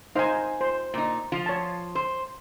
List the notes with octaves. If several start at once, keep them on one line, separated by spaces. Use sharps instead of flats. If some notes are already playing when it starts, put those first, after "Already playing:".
D#4 C5 F5 G#5
C5
A#2 D#4
F3 F4
C#5 A5
C5